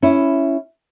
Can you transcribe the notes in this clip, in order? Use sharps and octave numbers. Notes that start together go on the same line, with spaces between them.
C#4 E4